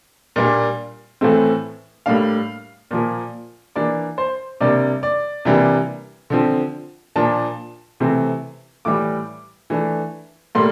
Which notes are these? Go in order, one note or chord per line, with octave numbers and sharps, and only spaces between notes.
A#2 G3 A#3 D4
A2 E3 A3 C4
A2 G3 A#3 D4 F5
A#2 F3 A#3
E3 A#3 D4 D5
C5
C3 G3 A#3 D4 D5
D5
C3 E3 G3 A#3 D4
D3 F3 C4
A#2 F3 A#3 D4 A5
C3 E3 A3 C4
A2 E3 G3 D6
E3 A3 D4
A2 G3 A#3 C6